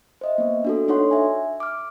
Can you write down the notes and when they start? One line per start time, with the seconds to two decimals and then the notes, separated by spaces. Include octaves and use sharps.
0.21 C5 D#5 E5
0.38 A#3 B3
0.65 D4 F#4 A4
0.88 D4 D#4 A4 C#5 F#5 C6
1.11 E5 G#5
1.60 D6 F6